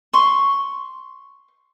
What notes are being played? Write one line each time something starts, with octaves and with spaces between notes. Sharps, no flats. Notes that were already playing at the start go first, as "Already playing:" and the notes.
C6 C#6